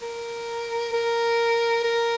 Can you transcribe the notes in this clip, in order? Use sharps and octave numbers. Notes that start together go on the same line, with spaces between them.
A#4
A#4
A#4